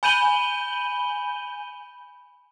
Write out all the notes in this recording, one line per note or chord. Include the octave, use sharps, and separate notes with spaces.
G#5 B5 G6 D#7 F#7 G7